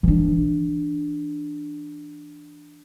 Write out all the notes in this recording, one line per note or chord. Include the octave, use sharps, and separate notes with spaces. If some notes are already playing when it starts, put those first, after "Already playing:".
E3 D4